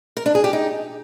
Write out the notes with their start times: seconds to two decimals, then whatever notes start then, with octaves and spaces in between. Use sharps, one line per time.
0.17 A#4
0.26 D4
0.35 G#4
0.44 G4
0.53 D#4